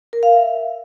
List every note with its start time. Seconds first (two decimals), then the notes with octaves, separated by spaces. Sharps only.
0.13 A#4
0.23 F5
0.33 E5